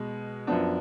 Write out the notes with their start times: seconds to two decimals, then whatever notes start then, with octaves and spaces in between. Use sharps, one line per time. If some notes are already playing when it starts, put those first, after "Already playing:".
Already playing: B2 G#3
0.47 F#2 F3 B3 D4